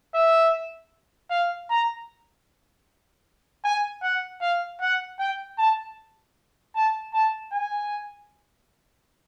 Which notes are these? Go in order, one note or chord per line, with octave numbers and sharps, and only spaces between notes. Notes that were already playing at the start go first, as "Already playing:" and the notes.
E5
F5
A#5
G#5
F#5
F5
F#5
G5
A5
A5
A5
G#5